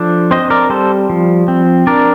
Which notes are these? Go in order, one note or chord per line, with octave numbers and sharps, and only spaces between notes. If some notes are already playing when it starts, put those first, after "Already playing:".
Already playing: F3 D4 A4 C5
C4 C5 D#5
A#4 D5
G3 A4 C5
F3
C4
D4 A#4 D5